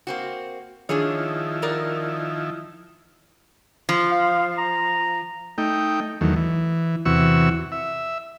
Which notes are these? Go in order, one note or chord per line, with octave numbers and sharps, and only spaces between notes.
A#3 C4 F#4
D#3 F3 D4 E4 G#4 C#5
F#4 A#4 D5
F3
F5
A#5
A3 D#4 G5
E2 D#3 F#3 A3
E3
E2 C3 E3 F#4 C#6 E6
E5